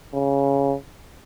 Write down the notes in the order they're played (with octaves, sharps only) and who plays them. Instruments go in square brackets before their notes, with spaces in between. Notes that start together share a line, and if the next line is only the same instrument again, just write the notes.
[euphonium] C#3